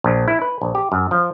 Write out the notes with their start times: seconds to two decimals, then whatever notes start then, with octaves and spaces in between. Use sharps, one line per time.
0.04 A#1
0.28 E4
0.42 B4
0.62 A#1
0.75 G4
0.92 F#2
1.11 F3